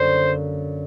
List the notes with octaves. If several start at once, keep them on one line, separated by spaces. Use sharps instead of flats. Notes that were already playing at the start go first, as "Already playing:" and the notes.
Already playing: F#2 D3 G3 A#3 C#4 C5